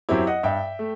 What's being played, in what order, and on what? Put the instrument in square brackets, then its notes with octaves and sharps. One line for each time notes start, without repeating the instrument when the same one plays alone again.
[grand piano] F#2 F#3 C4 E4 G4
D#5 F#5
G2 E5 G5
A3